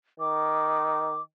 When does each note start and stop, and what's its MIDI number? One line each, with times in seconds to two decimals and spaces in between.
0.20 1.18 51
0.20 1.22 86